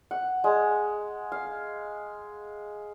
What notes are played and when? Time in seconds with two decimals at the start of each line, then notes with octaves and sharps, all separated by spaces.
0.11 F#5
0.44 G#3
1.32 F5